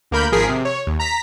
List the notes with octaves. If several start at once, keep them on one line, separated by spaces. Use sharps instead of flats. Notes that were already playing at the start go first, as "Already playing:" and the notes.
D2 A#3 A#4 B5 G6
G#1 F3 G#4 A#4 B6 C7
C3
C#5
D#2
A#5 B6